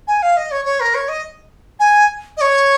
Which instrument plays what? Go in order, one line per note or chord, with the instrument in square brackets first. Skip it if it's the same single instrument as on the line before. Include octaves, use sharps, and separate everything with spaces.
[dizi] G#5
F5
D#5
C#5
C#5
A#4
C#5
D#5
G#5
D#5
C#5